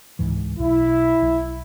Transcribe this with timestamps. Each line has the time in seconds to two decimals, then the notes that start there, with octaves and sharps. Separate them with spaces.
0.19 C#2 G#2 E3
0.59 B1 B2 E4
1.22 B1